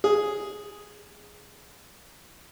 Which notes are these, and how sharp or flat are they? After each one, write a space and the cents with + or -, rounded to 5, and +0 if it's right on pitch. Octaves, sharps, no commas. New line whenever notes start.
G#4 +0